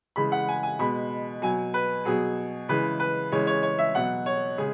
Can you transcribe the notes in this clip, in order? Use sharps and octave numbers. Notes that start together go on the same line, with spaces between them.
C#3 E3 G#3 B5
F#5
G#5
G#5
B2 G#3 B5
B2 F#3 G#5
B4
B2 F#3 G#4
C#3 E3 G#3 B4
B4
C#3 E3 G#3 C#5
C#5
C#5
E5
B2 F#3 F#5
C#5
C#3 G#3 G#4